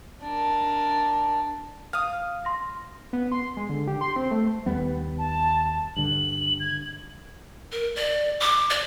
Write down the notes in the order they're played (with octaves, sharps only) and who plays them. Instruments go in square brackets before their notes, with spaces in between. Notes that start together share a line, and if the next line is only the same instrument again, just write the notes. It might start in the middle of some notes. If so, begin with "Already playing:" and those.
[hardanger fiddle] D4 A#4
[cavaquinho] F5 D#6 [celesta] F6
[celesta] C6 A#6
[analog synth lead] B3
C6
G#3
D3
G4
C6
C4
A3
[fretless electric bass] D#2 G3 B3
[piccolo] A5
[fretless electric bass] G2 D3 [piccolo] F#7
[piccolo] G#6
[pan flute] A#4
D5
D6
D5